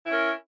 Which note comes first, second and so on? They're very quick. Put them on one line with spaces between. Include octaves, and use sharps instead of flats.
E4 C#4 A#4